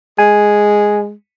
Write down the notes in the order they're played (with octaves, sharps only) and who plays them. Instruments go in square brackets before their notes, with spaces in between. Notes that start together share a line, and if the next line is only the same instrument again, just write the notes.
[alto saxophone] G#3 [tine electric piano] G#5